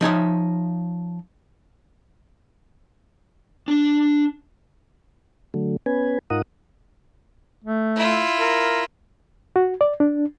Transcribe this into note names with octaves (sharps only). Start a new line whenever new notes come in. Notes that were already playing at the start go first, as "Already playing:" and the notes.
F3 D#4 C#5 E5
D4 A5
D3 F#3 A3
B3 C#4 B4 G#5
G#2 D#4 F4 A#4 F#5 D#6
A3
E4 F4
A#4
F#4
D5
D4